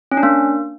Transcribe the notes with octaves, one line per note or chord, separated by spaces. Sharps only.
C#4
D4
A#3